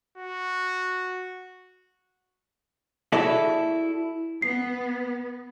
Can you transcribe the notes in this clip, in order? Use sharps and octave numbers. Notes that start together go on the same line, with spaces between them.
F#4
E4 F#4 G#4 A4 D5 E5
B3 C7